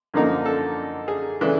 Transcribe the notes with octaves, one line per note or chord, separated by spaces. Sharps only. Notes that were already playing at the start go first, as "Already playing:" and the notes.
F#2 D3 F3 A#3 D#4
A4
G#4
C#3 E3 A3 D4